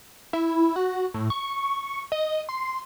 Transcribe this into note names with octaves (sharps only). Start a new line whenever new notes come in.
E4
F#4
A2
C#6
D#5
C6